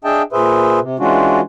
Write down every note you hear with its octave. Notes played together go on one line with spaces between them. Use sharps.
D4 G#4 D#5 E5 G5 A5
A#2 G#4 B4 C5 E5
C3
E3 G#3 C#4 D4 F4 F#4